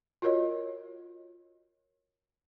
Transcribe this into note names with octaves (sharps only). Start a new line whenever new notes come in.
F4 F#4 A#4 C#5 D#5